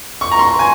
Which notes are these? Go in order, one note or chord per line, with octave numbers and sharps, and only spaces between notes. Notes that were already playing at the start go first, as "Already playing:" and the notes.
C#6
A#5
C6
G#5